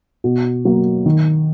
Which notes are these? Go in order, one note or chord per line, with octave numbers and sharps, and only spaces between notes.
B2
F#3 A#3
D#3